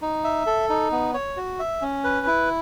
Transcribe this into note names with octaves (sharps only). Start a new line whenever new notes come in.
D#4
E5
A4
D#4
B3
C#5
F#4
E5
C#4
B4
E4